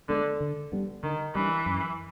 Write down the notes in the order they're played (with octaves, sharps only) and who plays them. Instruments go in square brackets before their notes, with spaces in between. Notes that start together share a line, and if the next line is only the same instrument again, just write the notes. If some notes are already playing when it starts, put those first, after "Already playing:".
[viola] D3 [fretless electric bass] G#3 B3 D4
[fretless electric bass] D3
G3 B3 D4
[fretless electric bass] D3 [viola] D#3
[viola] E3 [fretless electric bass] G3 B3 D4
[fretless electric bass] F#2